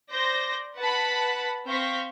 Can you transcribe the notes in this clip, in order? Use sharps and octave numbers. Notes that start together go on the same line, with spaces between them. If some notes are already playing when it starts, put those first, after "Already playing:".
C5 D5 G6 A#6
B4 F#5 A5 B5
C4 F5 C#6 G6 A#6 B6